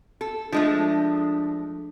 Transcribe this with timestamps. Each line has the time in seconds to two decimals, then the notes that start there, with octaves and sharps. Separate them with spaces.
0.21 A4
0.52 F3 G#3 A3 D4